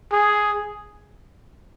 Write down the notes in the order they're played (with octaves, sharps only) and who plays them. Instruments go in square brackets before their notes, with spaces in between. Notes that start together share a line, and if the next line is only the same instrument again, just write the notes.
[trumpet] G#4